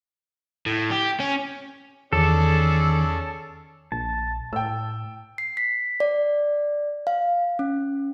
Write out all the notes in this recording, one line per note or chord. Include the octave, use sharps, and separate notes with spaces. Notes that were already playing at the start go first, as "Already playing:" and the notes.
A2
G4
C#4
E2 D#3 C#4 G#4 A4 D5
A#1 A5
A2 G5 E6
C7
B6
D5
F5
C#4